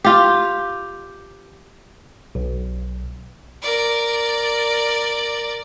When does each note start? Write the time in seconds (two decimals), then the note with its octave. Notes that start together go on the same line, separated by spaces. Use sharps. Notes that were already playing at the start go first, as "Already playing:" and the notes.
0.04 F4 G4
2.35 B1
3.62 A#4 D5